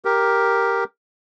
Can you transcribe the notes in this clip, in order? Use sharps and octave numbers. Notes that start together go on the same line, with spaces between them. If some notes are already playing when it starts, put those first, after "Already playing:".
G4 A#4